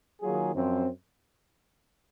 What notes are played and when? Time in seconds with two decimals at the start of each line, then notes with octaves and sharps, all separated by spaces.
0.21 D#3 F#3 A#3 F4 G#4
0.55 F#2 F3 C4